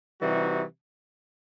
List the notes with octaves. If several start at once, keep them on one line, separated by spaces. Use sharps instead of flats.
C3 E3 G3 D#4 F#4